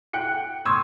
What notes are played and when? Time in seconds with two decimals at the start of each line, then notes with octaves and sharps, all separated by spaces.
0.13 F#5 G5 F#6 C#7
0.65 C6 C#6 D#6 E6 G#6